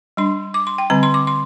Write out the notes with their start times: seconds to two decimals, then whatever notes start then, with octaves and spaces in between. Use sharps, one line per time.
0.17 G3 D4 C6
0.54 D6
0.67 C6
0.78 G5
0.90 D3 G3 C4 A#5
1.03 C6
1.14 D6
1.27 C6